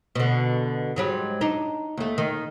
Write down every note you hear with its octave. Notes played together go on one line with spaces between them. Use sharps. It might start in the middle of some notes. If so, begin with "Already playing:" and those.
B2 D3
G#2 F#3 G3
D4 D#4
D#2 A3
D#3